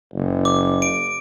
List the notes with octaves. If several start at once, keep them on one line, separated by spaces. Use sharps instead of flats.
F#1
D6
D7